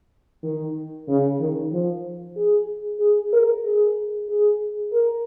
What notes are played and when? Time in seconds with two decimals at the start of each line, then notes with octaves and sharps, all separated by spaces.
0.43 D#3
1.08 C#3
1.40 D#3
1.72 F3
2.36 G#4
3.00 G#4
3.33 A#4
3.64 G#4
4.29 G#4
4.93 A#4